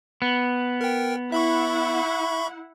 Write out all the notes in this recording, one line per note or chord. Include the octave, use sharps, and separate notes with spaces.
B3
A#4 G5
E4 E5 F#5 B5 C#6